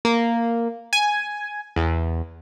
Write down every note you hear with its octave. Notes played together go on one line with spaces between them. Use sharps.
A#3
G#5
E2